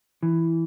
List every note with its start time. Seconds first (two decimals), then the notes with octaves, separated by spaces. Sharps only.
0.23 E3